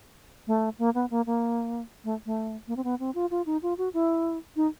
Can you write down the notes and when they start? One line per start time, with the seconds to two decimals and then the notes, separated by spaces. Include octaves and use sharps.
0.47 A3
0.79 A#3
0.95 B3
1.10 A#3
1.26 A#3
2.04 A3
2.26 A3
2.68 A#3
2.76 C4
2.84 B3
3.00 C4
3.15 F4
3.31 F4
3.46 D#4
3.63 F4
3.78 F#4
3.94 E4
4.56 D#4